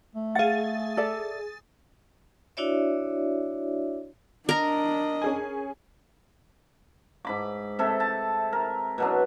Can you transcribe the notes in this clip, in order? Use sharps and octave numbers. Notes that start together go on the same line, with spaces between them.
A3
G#4 F5 F#5 A6
A4 D5 E5
D4 E4 F#4 C#5 D5 E5
D4 A#4 D#5 A#5
C#4 G#4 G#5
G#2 B5 D6
C3 A4 E5
A5
A#4
B2 F#3 D4